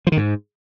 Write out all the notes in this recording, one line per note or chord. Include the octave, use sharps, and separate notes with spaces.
F3
D#3
G#2